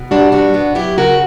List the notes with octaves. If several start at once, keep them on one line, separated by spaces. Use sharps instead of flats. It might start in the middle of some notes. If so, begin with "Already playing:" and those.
Already playing: B2
G3 D4 F#4
B2 D4 F#4
B3
F#3 E4 G4
C#3 F#4 A#4